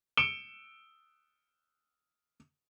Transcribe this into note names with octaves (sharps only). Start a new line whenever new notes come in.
C#7 D7 E7 G7